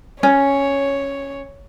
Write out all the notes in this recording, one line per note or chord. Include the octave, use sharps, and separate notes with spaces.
C#4 C#5